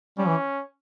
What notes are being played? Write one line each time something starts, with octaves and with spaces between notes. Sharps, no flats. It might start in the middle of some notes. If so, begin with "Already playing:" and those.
G3 C#4
E3